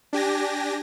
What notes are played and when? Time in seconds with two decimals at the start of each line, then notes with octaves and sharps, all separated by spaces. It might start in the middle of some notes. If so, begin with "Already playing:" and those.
0.13 D4 G4 G#5 A#6